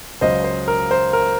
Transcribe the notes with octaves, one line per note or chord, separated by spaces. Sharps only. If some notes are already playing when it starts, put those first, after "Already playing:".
C#2 C#3 F#3 C5 D#5
C5
A#4
C5
A#4